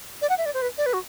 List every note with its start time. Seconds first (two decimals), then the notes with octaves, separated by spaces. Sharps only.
0.22 D5
0.29 F#5
0.38 E5
0.46 D5
0.54 C5
0.62 B4
0.78 D5
0.86 B4
0.93 F#4